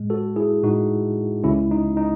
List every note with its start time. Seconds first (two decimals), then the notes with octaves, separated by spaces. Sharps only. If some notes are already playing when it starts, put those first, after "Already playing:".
Already playing: A2 G#3
0.10 F#4 A4
0.36 E4 G#4
0.63 A2 G#3 D#4 F#4
1.44 C#2 C#3 G#3 C#4 E4
1.71 D#4
1.97 D#4